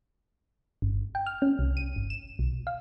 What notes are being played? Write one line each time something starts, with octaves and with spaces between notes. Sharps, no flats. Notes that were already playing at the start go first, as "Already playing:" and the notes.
G1
G5
F6
C#4
C2
D#7
G1
E7
B1
F5